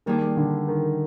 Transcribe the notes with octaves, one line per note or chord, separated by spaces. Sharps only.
D#3 G3 A#3 D4 G#4
D3
D#3